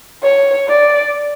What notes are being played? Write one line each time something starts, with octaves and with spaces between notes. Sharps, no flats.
C#5
D5